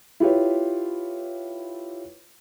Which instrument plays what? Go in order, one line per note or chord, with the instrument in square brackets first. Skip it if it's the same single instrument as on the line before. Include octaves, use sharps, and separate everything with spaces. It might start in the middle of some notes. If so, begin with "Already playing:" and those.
[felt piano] E4 F4 G4 B4 C#5